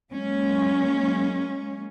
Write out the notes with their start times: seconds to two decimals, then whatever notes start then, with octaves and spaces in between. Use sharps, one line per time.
0.12 F#3 G#3 A#3 C#4